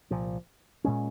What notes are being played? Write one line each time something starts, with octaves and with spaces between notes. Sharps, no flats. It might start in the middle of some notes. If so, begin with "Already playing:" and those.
C2 A#2 F3
A#2 G#3 C#4